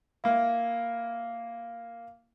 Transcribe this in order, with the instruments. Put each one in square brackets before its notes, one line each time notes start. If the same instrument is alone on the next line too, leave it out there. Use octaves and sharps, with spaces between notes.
[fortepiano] A#3 E4 [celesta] F5